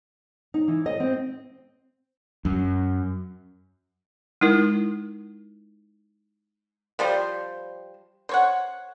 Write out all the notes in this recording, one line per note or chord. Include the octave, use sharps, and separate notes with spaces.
D#4
E3
D#5
C4
F#2
G#3 D#4 E4 A#4
F3 G3 C5
C5 C#5 F#5